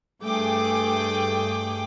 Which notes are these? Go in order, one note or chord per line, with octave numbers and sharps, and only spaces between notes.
G2 A3 G#4 G5 D6